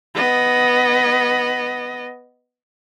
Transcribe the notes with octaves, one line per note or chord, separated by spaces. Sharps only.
B3 D#5